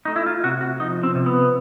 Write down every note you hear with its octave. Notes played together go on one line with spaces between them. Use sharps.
A3 D#4
E4
F4
C3 F#4
F#4
F3 D#4
C4
C3
B3